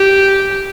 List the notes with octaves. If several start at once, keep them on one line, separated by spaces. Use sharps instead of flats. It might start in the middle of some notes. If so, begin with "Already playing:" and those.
Already playing: G4